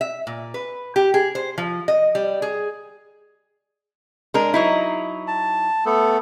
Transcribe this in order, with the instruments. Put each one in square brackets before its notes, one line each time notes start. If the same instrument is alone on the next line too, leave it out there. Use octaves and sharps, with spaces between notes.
[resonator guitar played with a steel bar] E5
A#2
B4
G4
G#4
C5
F3
D#5
G3
G#4
G#3 D4 A#4
F#3 D#4 E4
[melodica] A5
A3 B3 A4